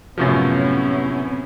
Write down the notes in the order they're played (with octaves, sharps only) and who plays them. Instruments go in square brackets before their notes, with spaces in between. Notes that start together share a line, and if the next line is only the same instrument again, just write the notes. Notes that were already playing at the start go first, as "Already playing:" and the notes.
[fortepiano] F#2 A2 F3 [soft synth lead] C3 [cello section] B3 C#4 E4